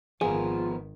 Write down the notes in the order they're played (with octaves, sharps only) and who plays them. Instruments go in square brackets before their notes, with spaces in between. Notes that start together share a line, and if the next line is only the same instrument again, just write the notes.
[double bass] G#1 D#3 [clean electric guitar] F3 B3 A#4 [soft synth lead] F4 [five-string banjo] G#4